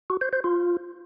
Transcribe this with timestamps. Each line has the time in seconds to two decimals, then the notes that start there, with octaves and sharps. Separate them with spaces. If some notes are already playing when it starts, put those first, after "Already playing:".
0.10 F#4
0.21 C5
0.33 C5
0.44 F4